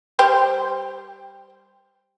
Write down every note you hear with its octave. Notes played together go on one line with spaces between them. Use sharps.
G3 G4 C5